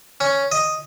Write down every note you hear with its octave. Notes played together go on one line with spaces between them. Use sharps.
C#4
D#5